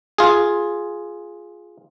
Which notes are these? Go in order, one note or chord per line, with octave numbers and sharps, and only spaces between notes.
F4 G#4